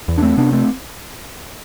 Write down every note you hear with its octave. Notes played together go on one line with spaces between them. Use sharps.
E2
D4
A3 C4
C3 B3 D4
A3 C4